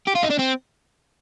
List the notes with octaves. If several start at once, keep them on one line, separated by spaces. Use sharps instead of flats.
G4
F4
D#4
D4
C4